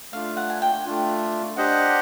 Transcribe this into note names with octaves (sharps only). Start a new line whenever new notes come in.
A3 D4 F4 F5
F#5
G#5
G5
A3 D4 F4
D4 G4 C5 D#5 F#5 G5